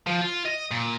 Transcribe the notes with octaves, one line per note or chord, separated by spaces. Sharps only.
F3
F4
D#5
A#2